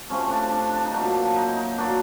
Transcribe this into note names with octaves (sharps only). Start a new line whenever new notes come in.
C3 F3 A3 C4 C#4
D4
D4
D4
D#4
A#2 F#3 A#3 D4
D#4
E4
D#4
A#2 F#3 A#3 D4